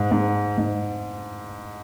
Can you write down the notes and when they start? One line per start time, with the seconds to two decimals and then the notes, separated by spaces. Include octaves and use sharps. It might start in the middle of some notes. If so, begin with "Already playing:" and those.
Already playing: G#2
0.12 G#2
0.58 G#2